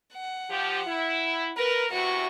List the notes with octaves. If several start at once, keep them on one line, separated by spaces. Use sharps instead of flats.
F#5
F3 G4
E4
A#4 B4
E2 C3 E3 F#4 C#6